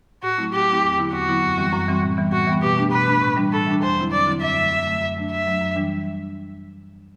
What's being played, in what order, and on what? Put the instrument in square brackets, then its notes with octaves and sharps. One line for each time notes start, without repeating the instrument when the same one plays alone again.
[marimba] A2 [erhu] F#4
[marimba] F#3 A3 C4 E4
[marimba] A2 [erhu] G4
[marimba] F#3 A3 C4 E4
E2
D3 F#3 B3 E4
[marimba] E2 [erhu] F#4
[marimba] D3 F#3 B3 E4
F#2
E3 G3 C4
F#2
E3 G3 C4
A2
E3 G3 B3
[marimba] A2 [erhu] F#4
[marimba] E3 G3 B3
[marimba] B2 [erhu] G4
[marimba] A3 D4
[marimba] B2 [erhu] B4
[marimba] A3 D4
A2
E3 G3 D4
[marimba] A2 [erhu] A4
[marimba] E3 G3 D4
[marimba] E2 [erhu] C5
[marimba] D3 F#3 C4 E4
[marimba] E2 [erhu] D5
[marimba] D3 F#3 C4 E4
[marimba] F#2 [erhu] E5
[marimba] D3 F#3 A3
F#2
D3 F#3 A3
F#2
F#3 A3 D4
[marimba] F#2 [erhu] E5
[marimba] F#3 A3 D4
F#2
E3 G3 D4